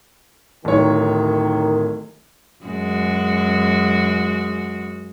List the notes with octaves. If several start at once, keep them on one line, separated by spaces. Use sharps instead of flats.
D1 D#3 C#5
F#2 G#3 F#4